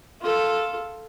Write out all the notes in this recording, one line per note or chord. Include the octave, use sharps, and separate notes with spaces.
F4 A4